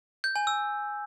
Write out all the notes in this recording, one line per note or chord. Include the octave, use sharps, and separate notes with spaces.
G6
G#5
E6